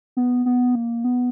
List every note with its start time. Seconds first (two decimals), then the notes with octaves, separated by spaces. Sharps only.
0.17 B3
0.46 B3
0.75 A#3
1.04 B3